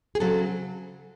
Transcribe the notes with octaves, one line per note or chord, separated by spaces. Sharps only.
G#4
C#3 F#3 C4 A4